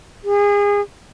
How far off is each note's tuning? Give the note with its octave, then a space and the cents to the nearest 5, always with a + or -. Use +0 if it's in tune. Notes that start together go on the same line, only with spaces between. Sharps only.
G#4 -30